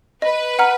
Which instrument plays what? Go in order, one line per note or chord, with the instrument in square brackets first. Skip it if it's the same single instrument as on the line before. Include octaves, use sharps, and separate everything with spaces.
[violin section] B4 [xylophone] D#5
[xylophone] F#5 A#5 F6